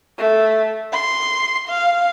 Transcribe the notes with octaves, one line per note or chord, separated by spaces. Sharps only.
A3
C6
F5